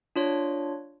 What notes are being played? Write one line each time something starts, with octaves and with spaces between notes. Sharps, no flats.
D4 F4 C#5